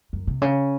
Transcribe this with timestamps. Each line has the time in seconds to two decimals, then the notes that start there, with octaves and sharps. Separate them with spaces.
0.13 F#2
0.27 C3
0.42 C#3